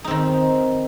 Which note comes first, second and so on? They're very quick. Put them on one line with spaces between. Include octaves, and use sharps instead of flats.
D#4 C4 D#3